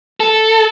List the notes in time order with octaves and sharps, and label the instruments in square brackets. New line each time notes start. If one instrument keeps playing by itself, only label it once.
[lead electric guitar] A4